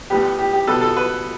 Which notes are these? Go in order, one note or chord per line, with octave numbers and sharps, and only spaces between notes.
A2 G3 B3 G4
G4
G4
B2 G3 B3 A4
A4
B4